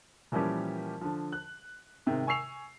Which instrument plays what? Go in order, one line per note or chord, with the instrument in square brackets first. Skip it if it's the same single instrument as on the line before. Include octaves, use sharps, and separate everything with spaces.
[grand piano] A#2 E3 F3 G3 C#4 G4
D3 F3
F#6
G#2 C3 D#3
G#5 C#6 E6 C7 F7